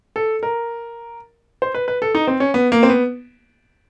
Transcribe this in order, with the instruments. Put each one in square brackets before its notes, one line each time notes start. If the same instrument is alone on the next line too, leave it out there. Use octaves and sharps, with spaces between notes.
[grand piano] A4
A#4
C5
B4
B4
A4
D#4
C4
C#4
B3
A#3
C4
B3